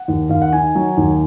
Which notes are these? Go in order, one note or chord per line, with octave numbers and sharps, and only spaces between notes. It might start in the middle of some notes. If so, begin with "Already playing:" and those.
Already playing: F#5
D#2
D#2 F5
F#5
D#3 G#5
F#3
D#2